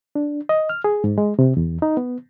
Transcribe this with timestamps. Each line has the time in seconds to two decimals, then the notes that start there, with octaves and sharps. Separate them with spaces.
0.15 D4
0.49 D#5
0.69 F6
0.84 G#4
1.04 G#2
1.18 G#3
1.39 C3
1.57 E2
1.82 D#4
1.97 B3